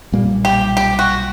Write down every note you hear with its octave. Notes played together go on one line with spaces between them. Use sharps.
B1 A#2 G3 A#3
G4
G4
F#4